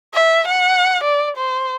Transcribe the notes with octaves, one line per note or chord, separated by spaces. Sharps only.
E5
F#5
D5
C5